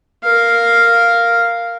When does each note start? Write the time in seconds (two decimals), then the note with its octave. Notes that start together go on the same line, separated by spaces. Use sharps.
0.23 A#4 F5